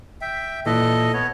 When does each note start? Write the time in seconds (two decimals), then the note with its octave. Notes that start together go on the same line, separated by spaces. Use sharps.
0.21 E5 G5
0.66 A#2 E3 A4 D#5
1.13 B3 C#5